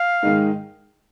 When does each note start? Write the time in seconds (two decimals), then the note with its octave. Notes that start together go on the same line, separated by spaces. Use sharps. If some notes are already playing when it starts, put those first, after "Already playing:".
Already playing: F5
0.23 G#2 D#3 G#3 D#4